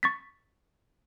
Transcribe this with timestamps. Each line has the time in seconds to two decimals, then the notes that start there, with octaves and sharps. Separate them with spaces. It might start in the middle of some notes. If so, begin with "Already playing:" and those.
0.03 C#6 A6 B6